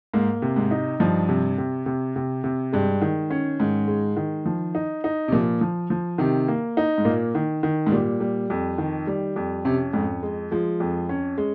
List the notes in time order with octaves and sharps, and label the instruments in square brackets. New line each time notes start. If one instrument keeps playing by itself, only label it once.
[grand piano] G#2 [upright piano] A#3
[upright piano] C3
[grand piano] G#2
[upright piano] D#4
[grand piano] G2 [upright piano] F3
[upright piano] C3
C3
C3
C3
C3
[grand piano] G2 [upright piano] G#3
[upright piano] D#3
C#4
[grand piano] G#2 [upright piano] D#3
[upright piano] G#3
D#3
F3
D#4
D#4
[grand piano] C3
[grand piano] A#2 [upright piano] F3
[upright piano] F3
F3
[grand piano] C3 [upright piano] D#3
[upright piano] A#3
D#4
[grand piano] G#2
[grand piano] A#2 [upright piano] A#3
[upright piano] D#3
D#3
[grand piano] G#2
[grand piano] A#2 [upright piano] G3
[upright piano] G3
F2
D#3
G3
F2
[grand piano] C3 [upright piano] C#4
[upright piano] F2 [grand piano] G#2
[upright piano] G#3
[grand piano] F3 [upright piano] G#3
[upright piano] F2
C#4
G#3